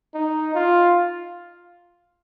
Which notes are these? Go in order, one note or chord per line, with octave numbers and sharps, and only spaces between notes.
D#4
F4